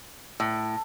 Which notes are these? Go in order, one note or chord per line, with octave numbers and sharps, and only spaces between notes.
A2